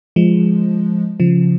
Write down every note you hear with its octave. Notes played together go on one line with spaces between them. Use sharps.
F3 G#3
C#3 F3